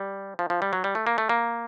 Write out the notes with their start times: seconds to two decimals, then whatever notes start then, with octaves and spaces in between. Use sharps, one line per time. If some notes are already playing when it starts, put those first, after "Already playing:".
Already playing: G3
0.39 F3
0.50 F3
0.62 G3
0.73 F#3
0.84 G3
0.95 A3
1.07 A#3
1.18 A3
1.29 A#3